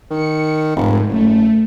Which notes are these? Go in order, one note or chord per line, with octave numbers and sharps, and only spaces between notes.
D#3 C#7
F1 G#2
F#1 A3